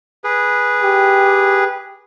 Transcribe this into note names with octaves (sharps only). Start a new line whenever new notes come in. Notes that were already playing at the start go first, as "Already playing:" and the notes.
G#4 B4
G4